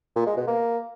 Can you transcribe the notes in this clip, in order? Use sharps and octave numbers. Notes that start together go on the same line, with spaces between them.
A#2
G#3
B2
A#3